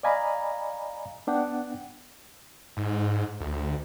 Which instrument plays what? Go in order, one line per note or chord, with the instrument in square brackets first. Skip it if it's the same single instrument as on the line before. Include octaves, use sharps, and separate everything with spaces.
[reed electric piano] D5 D#5 F5 G#5 A#5 B5
B3 D4 F#5 G5
[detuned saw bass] G#2
D2